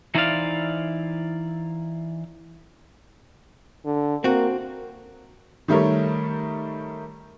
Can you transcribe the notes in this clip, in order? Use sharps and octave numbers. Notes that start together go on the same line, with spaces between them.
E3 D#4 E4 C5 D5 F5
D3
A#3 C4 F#4
D#3 G3 A3 A#4 C#5